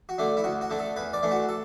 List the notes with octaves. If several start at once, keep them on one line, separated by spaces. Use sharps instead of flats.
F#4
D3 A3 D4
E4
D2 F#4
F#4
D3 A3 D4
A4
E2 B4
D5
E3 A3 D4
F#4
A4